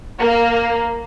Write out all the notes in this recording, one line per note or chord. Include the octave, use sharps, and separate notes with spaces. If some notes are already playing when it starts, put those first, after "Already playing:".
A#3